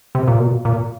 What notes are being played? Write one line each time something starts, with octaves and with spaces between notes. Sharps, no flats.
C3
A#2
B2
A#2